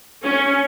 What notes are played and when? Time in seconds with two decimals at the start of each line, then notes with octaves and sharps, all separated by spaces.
0.23 C#4